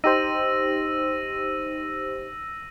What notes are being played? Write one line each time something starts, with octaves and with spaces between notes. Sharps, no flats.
D#4 G4 C5 E6 A#6 D#7